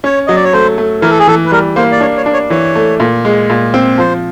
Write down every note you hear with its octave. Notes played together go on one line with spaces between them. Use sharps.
C#4 C#5
F#3 D#5
D5
C#5
A3 C5
A3
E3 A#4
A4
G#4
E3 A4
B4
G3 A#4
A#3 C5
D5
D4 C#5
C#5
D4
C#5
E3 C#5
A3
A#2
G#3
A#2
C4
F3 C5